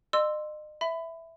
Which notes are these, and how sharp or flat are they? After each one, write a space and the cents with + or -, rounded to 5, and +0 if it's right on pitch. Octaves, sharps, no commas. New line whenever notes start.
D#5 -40 C6 +0 E6 +0
E5 +0 B5 +25